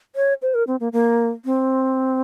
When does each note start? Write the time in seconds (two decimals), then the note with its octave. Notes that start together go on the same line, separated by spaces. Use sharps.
0.16 C#5
0.42 C5
0.54 A#4
0.67 C4
0.80 A#3
0.93 A#3
1.45 C4